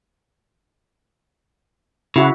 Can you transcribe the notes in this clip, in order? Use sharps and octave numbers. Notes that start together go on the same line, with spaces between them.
C#3 E4 F#4 F#5